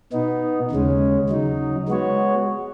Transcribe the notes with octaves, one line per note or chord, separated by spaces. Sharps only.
B2 B3 D#4
D#2 C#3 G#3 C#4
C#3 F#3 D#4
G#3 B3 F#4 C#5